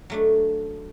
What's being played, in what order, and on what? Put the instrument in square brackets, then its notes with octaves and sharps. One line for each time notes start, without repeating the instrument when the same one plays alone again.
[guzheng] F#3 A3 D4